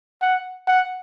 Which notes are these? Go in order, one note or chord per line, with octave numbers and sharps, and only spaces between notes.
F#5
F#5